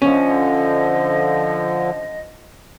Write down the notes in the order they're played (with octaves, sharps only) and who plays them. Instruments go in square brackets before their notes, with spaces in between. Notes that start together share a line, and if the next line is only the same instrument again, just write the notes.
[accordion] D3 F3 [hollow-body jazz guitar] C#4 [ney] D#5